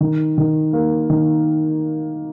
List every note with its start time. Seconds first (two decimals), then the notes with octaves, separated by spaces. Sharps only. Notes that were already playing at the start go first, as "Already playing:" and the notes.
0.01 D#3
0.38 D#3
0.73 A#3
1.10 D#3